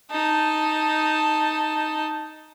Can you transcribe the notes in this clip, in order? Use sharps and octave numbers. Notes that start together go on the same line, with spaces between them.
D#4 A5